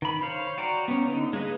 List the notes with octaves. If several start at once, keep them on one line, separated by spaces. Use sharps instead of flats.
D#3 B5
C5 C#5 F5
F#4 D5 G5 A#5
B3 C#4
D3 D#4
G#3 A#3 G#4 B4 D#5